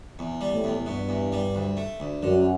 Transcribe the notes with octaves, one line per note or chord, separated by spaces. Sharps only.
E2
G3
A2
E2
G2 B2
E2
G3
D2
A3
D2
F#2 D3